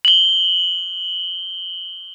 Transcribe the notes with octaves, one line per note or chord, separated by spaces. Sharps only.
F#7 G7